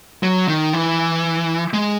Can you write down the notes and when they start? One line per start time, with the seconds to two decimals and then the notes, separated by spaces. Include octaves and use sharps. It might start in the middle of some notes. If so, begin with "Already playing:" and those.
0.23 F#3
0.48 D#3
0.73 E3
1.73 G#3